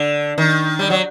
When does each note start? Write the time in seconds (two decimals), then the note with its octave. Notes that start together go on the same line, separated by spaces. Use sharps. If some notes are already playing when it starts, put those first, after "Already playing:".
Already playing: D3
0.38 D#3
0.79 G3
0.90 F#3